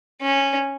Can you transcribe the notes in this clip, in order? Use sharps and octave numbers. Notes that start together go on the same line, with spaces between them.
C#4